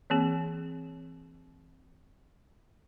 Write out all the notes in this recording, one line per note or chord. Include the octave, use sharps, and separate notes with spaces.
E3 A#3 C4 G#4